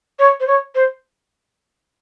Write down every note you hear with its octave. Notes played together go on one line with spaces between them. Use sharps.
C#5
C5
C#5
C5